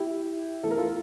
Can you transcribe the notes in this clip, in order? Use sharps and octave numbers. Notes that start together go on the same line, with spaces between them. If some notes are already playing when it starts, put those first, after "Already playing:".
Already playing: E4 G4
E2 E3 A3 A4
A#4
F4 A4